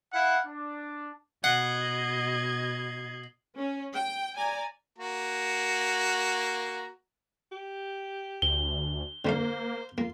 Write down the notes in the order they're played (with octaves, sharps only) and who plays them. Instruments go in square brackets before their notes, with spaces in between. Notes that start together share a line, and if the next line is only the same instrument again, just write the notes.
[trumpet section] E4 F5 F#5
D4
[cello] B2 [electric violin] D#5 G#6 [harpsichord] F#5 [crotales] C7 F#7 G7
[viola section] C#4
G5
D5 G#5 A#5
[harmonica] A#3 F#4 A#5
[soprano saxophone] G4
[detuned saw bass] D2 [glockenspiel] G7
[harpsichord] D3 A3 F5 [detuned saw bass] A#3 [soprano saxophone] C5
[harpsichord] A#3 [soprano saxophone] F4